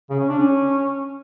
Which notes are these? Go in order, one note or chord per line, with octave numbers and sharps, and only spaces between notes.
C#3
C#4
D4
C#4